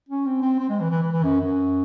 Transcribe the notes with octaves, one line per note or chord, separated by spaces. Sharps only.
C#4
C4
C4
C4
G#3
E3
E3
E3
E3
F#2
F#2